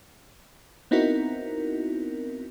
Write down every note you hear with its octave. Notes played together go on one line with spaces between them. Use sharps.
B3 C4 D#4 E4 F#4 A#4